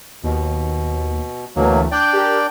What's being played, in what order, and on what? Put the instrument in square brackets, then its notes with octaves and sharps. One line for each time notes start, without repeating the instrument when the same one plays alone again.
[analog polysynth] D#2 [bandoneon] B2
[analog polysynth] D2 E3 A3 [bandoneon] B2 F#3 A#3
[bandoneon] D4 D5 G5 [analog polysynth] D6 F#6 G6
[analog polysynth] G4 A#4